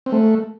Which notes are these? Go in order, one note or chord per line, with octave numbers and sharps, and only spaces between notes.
C4
A3